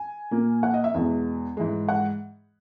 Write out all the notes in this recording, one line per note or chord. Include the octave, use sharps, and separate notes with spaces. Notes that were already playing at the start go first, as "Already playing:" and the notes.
Already playing: G#5
A#2 A#3
F#5
D#5
E5
E2 B2 G#3
G#2 E3 G#3
F#5